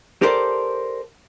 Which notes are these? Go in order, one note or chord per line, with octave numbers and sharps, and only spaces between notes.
G4 A4 A#4 C5 D5